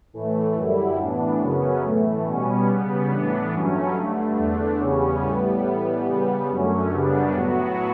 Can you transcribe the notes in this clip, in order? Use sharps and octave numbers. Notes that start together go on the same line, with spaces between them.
A2 E3 A3
F#2 D3 G3 E4
A2 E3 B3 D4
F#2 C#3 F#3 B3 C#4
A2 E3 A3
B2 G3 B3 C#4
C#3 G3 B3
A2 E3 B3 D4
G2 F#3 A3 C#4
G2 D3 A3
E2 D3 A3 D4
E2 C#3 G3 B3 C#4
A2 G3 B3
A2 E3 G3 B3
C#3 G3 B3
F#2 D3 F#3 A3 C#4
F#2 C#3 G3 B3 D4
A2 F#3 B3 F#4